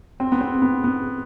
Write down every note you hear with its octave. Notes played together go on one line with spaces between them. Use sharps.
C4
B3
C4
B3
B3